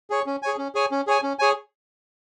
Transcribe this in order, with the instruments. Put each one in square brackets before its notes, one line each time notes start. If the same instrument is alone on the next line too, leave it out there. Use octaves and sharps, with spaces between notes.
[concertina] G#4 C#5
C#4
G#4 C#5 G#5
C#4
G#4 C#5 G#5
C#4
G#4 C#5 G#5
C#4
G#4 C#5 G#5